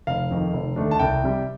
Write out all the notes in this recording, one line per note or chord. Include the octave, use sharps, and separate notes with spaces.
F1 F5
F2 D#3
F1
D#2 D3 A3 D4
A5
C2 G5
C3 G3